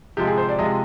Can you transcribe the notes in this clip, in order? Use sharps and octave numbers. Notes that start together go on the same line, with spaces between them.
C3 F3 G#3 G4
G#4
C5
D5
C3 F3 G#3 D#5